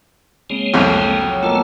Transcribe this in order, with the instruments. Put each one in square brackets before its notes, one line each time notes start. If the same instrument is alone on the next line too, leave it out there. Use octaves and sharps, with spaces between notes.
[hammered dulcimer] C#3 [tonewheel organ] G#3 A#3 C4
[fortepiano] C2 F2
[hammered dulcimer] F#3
[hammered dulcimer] B2 A#3 A4 [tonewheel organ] A3 F4